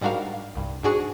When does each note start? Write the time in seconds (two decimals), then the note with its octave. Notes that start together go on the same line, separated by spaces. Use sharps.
0.01 G#2 G3 D4 F#4 A#4 F5
0.55 C2 G2
0.83 G#2 G#3 D4 F#4 G#4 C#6